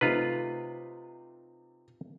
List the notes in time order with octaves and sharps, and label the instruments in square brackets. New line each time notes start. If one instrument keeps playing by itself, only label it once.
[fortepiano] C3 A3 D#4 [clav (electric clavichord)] F4 B4